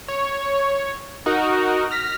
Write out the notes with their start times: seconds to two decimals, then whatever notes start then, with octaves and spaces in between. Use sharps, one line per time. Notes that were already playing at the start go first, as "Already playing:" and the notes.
0.08 C#5
1.26 D#4 F#4 A#4
1.91 F6 A#6 B6